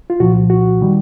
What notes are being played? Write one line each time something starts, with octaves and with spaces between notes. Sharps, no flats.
F4
C2 A#2 F3 F#4
F#4
D#3 G3